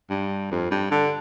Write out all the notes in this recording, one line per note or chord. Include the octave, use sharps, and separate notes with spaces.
G2
F2
G2
D3